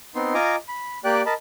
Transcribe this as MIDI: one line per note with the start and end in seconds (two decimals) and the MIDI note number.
0.15 0.34 59
0.15 0.34 60
0.15 0.34 63
0.15 0.34 84
0.34 0.56 65
0.34 0.56 75
0.34 0.56 80
0.34 0.56 82
0.34 0.56 86
0.68 0.98 83
1.04 1.22 58
1.04 1.22 67
1.04 1.22 74
1.04 1.22 79
1.04 1.22 90
1.26 1.34 70
1.26 1.34 75
1.26 1.34 81
1.26 1.34 83